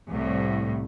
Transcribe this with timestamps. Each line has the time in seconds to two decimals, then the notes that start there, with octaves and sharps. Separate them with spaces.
0.11 C2 A2